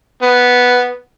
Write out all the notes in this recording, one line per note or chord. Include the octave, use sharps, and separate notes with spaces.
B3